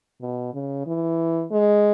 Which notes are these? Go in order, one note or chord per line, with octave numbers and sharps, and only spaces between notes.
B2
C#3
E3
G#3